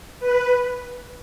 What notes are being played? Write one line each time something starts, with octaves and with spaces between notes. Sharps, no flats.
B4